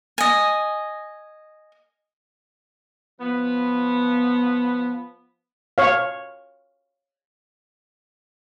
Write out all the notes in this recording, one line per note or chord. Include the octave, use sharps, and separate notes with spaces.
D#5 G#5
F3 B3
C#5 F5